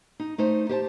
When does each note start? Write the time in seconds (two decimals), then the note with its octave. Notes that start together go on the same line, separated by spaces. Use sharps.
0.20 D#4
0.38 A3 D#4 C5
0.69 G4 C5 A5